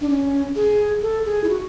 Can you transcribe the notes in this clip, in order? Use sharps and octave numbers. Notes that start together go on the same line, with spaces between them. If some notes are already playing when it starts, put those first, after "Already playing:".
D4
C#4
G#4
A4
G#4
E4
F#4